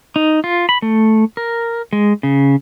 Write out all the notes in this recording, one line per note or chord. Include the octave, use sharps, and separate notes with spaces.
D#4
F4
B5
A3
A#4
G#3
C#3